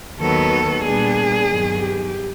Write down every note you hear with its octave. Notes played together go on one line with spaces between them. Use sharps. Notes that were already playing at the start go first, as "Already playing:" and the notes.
D#2 D#3 F#3 B3 A4
A#2 G3 B3 D4 G#4
G2 D#3 F#3 B3
G4